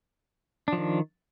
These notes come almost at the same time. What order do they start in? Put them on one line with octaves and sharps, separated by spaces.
D4 F3 D#3